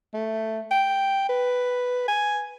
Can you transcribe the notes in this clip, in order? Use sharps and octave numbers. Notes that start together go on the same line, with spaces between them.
A3
G5
B4
G#5